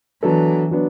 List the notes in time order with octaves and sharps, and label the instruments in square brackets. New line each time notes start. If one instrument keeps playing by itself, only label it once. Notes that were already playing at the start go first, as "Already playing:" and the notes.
[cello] E3 [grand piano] F#3 B3 D4 A4
[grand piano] F#3 B3 D4